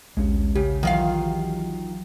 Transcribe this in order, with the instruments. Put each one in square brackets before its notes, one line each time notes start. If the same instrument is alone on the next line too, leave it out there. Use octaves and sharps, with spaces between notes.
[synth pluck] A#1 D#2 [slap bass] G#3 C#4
[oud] C#3 [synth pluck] G4
[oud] D#3 F4 F5 [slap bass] E3 [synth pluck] F#3